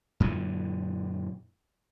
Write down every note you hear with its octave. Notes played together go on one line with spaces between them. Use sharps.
F#2 A#2 D3 E3